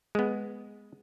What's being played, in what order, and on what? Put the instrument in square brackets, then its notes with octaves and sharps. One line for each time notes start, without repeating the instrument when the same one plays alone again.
[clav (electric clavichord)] G#3 B3